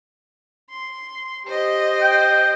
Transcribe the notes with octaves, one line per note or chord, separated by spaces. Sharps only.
C6
G4 C5 D#5
G5